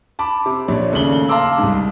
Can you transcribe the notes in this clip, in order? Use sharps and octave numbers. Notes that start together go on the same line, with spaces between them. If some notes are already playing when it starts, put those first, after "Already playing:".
A5 B5 D6
C3
A#1 A#2 C#5 D5
D#2 C#3 A3 F#7 G7
F5 A5 A#5 C6 D6 E6
C2 G#2